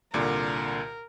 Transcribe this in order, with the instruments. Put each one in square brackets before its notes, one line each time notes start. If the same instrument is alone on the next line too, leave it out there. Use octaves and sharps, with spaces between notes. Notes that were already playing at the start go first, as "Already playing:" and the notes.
[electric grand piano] C2 A#2 D3 [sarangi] A#4